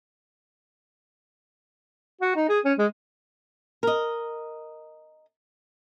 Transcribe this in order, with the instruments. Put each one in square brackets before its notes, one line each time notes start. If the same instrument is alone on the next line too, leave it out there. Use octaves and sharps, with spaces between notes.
[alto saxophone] F#4
D#4
G#4
C#4
G#3
[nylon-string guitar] A#4 D#5